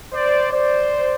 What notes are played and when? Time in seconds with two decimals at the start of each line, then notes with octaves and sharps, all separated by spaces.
0.13 C5 D5
0.52 C5 D5